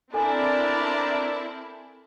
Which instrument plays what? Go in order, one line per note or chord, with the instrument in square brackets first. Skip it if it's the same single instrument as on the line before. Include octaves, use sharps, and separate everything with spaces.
[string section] C4 E4 A5 [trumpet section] D4 A#4 D5 [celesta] A4 G#5